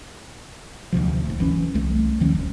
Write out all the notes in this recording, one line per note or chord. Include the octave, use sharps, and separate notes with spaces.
D2 G2 C3 F3
D1 D#2
F#1 E3 C#4
C2 A3 C4
D2 D#3 F3 C#4
E1